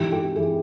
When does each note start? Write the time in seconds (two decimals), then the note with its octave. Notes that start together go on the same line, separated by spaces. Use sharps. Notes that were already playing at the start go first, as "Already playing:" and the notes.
Already playing: G#2 E3 G4
0.12 G4
0.36 E3 G#4